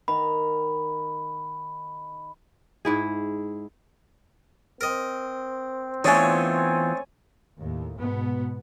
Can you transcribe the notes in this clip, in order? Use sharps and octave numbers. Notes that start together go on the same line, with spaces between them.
D#3 B5
G#2 E4 G#4
C4 A#4 D#5
E3 A3 B3 D4 D#4 F4 C#5 G#5
D#2 A2
G#2 B2 B3